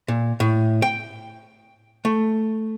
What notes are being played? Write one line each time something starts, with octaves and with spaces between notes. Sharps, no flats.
A#2
A2
G5
A3